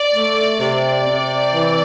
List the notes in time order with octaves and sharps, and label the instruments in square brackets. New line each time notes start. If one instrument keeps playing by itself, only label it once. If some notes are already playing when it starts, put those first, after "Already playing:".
Already playing: [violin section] D5
[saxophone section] A3
[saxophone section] C3 [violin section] D5
[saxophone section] C3
E3